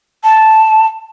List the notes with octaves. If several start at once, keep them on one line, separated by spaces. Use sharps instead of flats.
A5